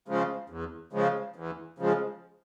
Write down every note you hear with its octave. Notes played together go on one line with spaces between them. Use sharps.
C#3 F3 G#3
E2
C#3 F3 G#3
E2
C#3 F3 G#3